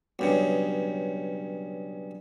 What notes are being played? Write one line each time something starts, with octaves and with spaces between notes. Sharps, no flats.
B1 G2 C#3